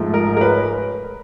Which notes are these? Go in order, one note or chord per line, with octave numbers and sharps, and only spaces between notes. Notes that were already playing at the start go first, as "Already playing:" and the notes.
Already playing: G#2 F3 A3
A#4
A#4
B4